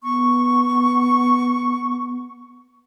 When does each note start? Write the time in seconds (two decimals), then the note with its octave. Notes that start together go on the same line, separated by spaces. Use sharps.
0.03 B3 C#6